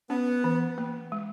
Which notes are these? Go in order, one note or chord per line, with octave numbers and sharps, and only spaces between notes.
B3 C#4
E3
A#3
G#3